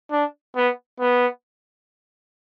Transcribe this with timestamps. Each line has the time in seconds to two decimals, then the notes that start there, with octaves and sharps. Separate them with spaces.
0.11 D4
0.56 B3
1.00 B3